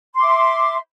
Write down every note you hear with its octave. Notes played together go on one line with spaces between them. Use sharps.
E5 C6 D6